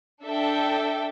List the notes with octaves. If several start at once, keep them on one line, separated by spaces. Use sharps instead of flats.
D4 A4 E5 G5